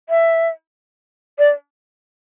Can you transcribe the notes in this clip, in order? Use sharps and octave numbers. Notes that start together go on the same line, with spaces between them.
E5
D5